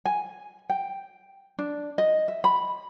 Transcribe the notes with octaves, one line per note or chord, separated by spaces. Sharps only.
G#5
G5
D4
D#5
E5
B5